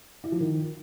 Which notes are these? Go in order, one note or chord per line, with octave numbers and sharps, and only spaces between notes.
E4
F3
D#3